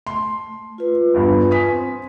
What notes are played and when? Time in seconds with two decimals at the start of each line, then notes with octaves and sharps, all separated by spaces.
0.07 A3 C6
0.78 F4 B4
1.14 E2 G2
1.51 G#5 D#6 B6
1.71 C4 C5